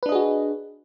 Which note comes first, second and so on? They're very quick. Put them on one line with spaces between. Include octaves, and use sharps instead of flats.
B4 D4 D#5 G#4 F#4